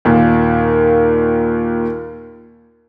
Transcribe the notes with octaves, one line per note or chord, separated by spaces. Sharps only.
D#2 A#2